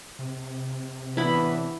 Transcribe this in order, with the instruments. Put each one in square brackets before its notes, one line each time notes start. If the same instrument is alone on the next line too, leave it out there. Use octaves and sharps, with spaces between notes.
[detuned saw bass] C3
[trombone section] A2 B3 [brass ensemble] E3 D4 [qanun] E4 B5